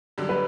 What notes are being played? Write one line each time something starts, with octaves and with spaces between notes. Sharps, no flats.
F#2 D3 G3
B4